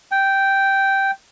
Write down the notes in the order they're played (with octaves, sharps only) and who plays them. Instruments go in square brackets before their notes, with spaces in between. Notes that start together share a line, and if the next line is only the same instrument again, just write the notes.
[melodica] G5